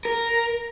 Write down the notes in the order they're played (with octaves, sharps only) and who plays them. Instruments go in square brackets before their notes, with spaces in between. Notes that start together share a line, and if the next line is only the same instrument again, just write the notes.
[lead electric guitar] A#4